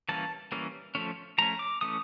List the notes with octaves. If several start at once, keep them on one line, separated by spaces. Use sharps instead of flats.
E3 G3 A#3 C#4 A5
E3 G3 A#3 C#4
F3 A3 C#4
F3 A3 C#4 A#5
D6
E3 A3 C#4 D#6